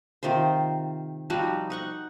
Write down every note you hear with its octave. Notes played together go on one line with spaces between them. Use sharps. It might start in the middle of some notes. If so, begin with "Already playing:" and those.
C3 D#3 F4 C5
F3 G3 D#4 F#4
D#4 F#5 C#6